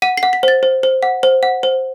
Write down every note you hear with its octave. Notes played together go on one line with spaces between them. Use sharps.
F#5 D#7
C7
F#5
B6
C5 A6
C5
C5
F#5
C5
F#5
C5